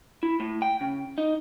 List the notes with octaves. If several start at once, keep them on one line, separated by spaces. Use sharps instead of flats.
E4
A2
G5
C#3
D#4